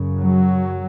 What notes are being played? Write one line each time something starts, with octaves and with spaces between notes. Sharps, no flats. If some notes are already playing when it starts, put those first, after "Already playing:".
Already playing: F#2 C#3
F#3